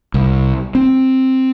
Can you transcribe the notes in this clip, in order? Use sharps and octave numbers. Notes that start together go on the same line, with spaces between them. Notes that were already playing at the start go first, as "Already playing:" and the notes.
C2
C4